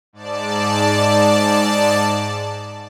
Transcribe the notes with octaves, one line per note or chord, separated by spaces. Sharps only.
G#2 D5 A5